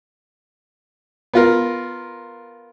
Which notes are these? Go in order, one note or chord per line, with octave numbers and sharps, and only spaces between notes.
B3 F4 A#4